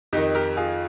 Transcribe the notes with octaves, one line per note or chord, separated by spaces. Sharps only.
F2 D#3 D#4 G4
G4 A#4
F4 G#4